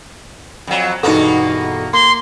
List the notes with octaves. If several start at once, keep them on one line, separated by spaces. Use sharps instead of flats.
F2 F#3
E2 G2 B2 A#3 B3 D#4 E4 A4
A#3 C6